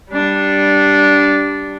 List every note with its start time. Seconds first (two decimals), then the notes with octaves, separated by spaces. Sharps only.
0.11 G3 D4